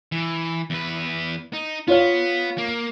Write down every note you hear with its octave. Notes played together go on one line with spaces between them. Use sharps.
E3
E2 B4
D#4
B3 F4 C#5 F5
A#3